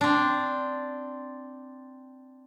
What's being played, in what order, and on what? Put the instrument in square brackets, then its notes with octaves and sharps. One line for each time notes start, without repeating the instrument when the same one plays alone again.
[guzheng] C4 D4